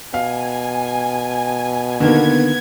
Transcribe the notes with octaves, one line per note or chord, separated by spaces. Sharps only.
B2 F5 G#5
D3 D#3 A#3 B3 G#6